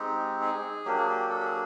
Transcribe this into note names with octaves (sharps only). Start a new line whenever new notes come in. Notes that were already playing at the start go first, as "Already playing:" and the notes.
Already playing: G#3 C4 D#4 G4
G#4
F#3 A#3 D4 G4
G#4
G4
A4
G4
G#4